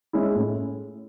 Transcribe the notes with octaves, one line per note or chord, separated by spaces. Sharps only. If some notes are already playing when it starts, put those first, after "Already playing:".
G#3 C#4 E4
A2